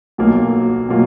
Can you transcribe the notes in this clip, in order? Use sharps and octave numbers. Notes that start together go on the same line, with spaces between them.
B1 B2 F#3 A#3 F4
B2 F#3 A#3 F4